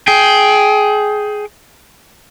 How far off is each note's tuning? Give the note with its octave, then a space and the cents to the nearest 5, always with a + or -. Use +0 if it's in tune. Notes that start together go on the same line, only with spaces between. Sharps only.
G#4 +15 G5 +0